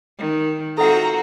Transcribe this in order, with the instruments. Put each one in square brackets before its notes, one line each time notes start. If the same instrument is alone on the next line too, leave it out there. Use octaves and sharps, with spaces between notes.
[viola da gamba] D#3
[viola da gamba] C4 F4 F#4 [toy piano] A4 E5 F#5 [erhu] A#5